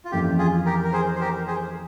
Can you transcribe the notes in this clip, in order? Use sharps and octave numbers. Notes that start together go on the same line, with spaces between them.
F4
F2 E3 A#3 C#4 E4 G4
F4 G#4
G4 A#4
A#4
G#4 C5
C5
G4 A#4
G#4 C5